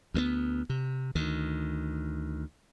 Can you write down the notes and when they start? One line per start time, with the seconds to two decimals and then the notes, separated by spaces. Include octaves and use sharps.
0.14 D2 A3 B3
0.70 C3
1.15 D2 D#3